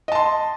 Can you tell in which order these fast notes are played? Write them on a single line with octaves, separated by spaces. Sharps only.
D#5 A5 C6